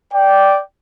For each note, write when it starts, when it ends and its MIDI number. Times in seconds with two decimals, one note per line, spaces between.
0.13 0.61 74
0.13 0.61 79